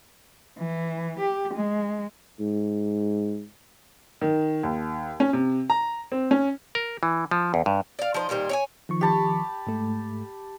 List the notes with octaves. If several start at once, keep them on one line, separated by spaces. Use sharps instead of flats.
E3
G4
G#3
G#2
D#3
D#2
C#4
C3
A#5
C4
C#4
A#4
E3
F3
E2
G2
D5 F5
F3 D#4 C5
A#2 D#3 G3 C5
C#5 D5 G#5
D#3 F3 C#6
G4 A5 B5
G#2 A3